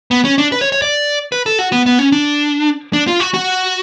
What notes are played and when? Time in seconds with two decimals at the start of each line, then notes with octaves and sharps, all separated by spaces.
0.11 B3
0.25 C#4
0.38 D4
0.52 B4
0.61 C#5
0.72 C#5
0.82 D5
1.32 B4
1.46 A4
1.59 F#4
1.72 B3
1.86 B3
1.99 C#4
2.12 D4
2.93 D4
3.07 F4
3.20 F#4
3.34 F#4